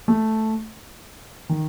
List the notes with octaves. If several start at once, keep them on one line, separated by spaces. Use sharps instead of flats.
A3
D#3